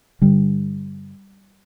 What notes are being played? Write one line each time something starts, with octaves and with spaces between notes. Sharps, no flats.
G2 D3 G3